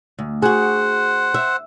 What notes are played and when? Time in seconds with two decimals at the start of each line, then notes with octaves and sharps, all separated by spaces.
0.19 D2
0.42 F#4 G#4 C5 F#5
1.34 E5